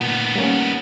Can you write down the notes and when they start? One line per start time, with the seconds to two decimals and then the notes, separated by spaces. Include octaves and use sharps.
0.01 A#2 D#3 B3
0.36 G3 A#3 C#4